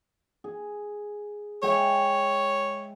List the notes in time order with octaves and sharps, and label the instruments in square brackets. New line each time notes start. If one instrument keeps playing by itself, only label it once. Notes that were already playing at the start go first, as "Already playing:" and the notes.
[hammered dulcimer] G#4
[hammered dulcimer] G#3 E5 G5 [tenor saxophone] C#5